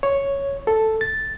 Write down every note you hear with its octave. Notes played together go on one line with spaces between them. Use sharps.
C#5
A4
A6